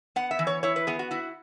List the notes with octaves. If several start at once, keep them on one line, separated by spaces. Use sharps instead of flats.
B3 F#5
E5
E3
C#5
E4 C#5
B4
B3 G#4
F#4
E4 F#4